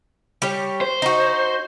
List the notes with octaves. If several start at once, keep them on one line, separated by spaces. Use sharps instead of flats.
G3 G4 C#5
C5
D#4 F#4